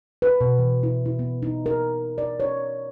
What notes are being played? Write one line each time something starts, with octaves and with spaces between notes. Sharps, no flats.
B4
B2
E3
E4
E4
B3
D#4
A#4
D5
C#5